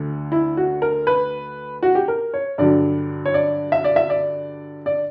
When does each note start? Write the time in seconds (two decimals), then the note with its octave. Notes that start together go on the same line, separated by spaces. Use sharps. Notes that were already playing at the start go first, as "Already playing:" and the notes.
Already playing: D2 D3
0.32 E4
0.57 F#4
0.82 A#4
1.07 B4
1.83 F#4
1.95 G4
2.08 A#4
2.34 C#5
2.58 G2 D3 F#3 D5
3.26 C#5
3.34 D5
3.72 E5
3.84 D5
3.96 E5
4.10 D5
4.86 D5